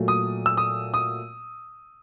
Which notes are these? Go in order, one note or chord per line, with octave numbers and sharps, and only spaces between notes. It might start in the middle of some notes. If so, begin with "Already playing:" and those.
Already playing: A#2 F#3 A3
D#6
E6
D#6
D#6